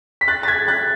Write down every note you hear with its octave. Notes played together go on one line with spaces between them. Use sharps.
B6
F#6 A6
A6
G#6 B6
F#6 A6